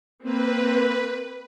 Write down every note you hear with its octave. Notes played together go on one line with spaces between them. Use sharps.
A#3 C4 B4